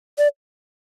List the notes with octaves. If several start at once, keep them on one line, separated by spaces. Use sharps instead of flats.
D5